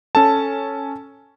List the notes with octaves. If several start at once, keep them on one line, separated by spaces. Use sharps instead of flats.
C#4 A4 A5